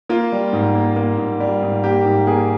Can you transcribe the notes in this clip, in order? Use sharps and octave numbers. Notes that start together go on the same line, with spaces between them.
A#3 F4
G3
G#2
A#3
A#3
G#2
G3
G#2
A#3 G4
G#2
A#3 G#4